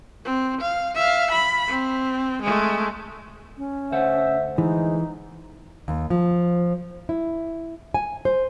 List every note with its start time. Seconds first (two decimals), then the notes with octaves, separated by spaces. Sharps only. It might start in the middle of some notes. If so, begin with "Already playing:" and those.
0.25 C4
0.61 F5
0.94 E5 F5
1.32 B5
1.67 C4
2.43 G#3 A3
3.58 C#4
3.92 D2 C5 E5 F#5
4.58 E3 G#3 D#4
5.88 D#2
6.10 F3
7.09 E4
7.94 G#5
8.25 C5